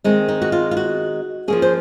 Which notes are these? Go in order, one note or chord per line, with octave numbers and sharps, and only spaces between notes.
D#3 G#3 C4 D#4
D#4
F#4
F4
F4
F#4
F3 A#3 C#4 G#4
C5